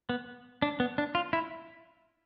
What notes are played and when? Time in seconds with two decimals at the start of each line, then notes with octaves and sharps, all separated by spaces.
0.09 B3
0.62 D4
0.80 B3
0.98 D4
1.15 F4
1.33 E4